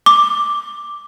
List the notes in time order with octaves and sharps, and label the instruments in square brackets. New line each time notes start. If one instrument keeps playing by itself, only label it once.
[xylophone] D6